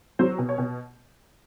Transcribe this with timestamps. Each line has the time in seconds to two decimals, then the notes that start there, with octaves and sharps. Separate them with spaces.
0.19 F#3 C5
0.38 B2
0.49 C#5
0.58 B2